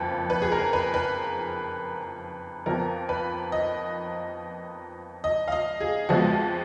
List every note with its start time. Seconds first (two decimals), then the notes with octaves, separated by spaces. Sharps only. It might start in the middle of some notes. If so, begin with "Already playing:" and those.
Already playing: F#1 F2 F3 B4
0.30 B4
0.42 G#4
0.52 A#4
0.73 B4
0.94 B4
2.66 F2 F3 B3 A#4
3.09 B4
3.52 D#5
5.24 D#5
5.48 F5
5.52 D#5
5.80 G#4
6.09 F2 F3 G#3 B3 F#4
6.31 F4